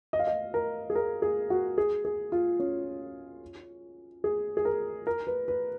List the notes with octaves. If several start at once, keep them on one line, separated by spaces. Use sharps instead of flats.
D#5
F5
D#5
A#4
G#4
A#4
G#4
F#4
G#4
G#4
F4
C#4
G#4
G#4
A#4
A#4
B4
B4